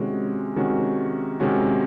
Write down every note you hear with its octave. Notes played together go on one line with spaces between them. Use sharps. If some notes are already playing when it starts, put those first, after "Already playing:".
Already playing: C3 D#3 G#3 C#4 F#4
C3 D#3 G#3 C#4 F#4
C3 D#3 G#3 C#4 F#4